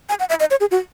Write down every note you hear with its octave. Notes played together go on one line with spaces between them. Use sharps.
G#5
F#5
E5
D#5
C#5
G#4
F#4